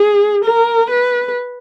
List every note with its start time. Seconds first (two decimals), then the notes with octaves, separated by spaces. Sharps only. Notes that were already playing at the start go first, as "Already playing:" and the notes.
Already playing: G#4
0.45 A#4
0.90 B4